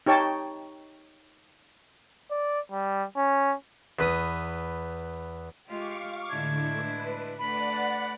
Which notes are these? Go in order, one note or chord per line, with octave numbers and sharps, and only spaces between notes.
D#4 G4 C#5 G5 A5
D5
G3
C#4
E2 B4 D#6
G#3 F4 G4 F5 C#6 D6
A2 D3 G#3 D4 E4 G#6
B4
A3 D4 B4 D5 F#5 B5